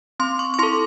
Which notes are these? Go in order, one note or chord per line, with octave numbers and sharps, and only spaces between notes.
C4 C6
C#6
C#6
E4 A4 C6